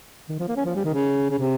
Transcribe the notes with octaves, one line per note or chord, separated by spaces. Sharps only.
D#3
F3
A#3
C#4
F3
G3
D#3
C#3
C#3
C3